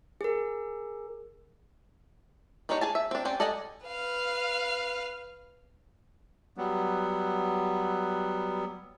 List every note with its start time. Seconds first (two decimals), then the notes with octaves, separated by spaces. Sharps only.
0.21 G#4 A#4
2.69 B3 D4 D#4 G4 C#5
2.81 G#4 G#5 A5
2.95 E5
3.11 C4 D4
3.25 C4 C#4 G4 C5 D5
3.40 A4 D5 D#5 F#5 G#5
3.86 B4 F5
6.57 F#3 G3 B3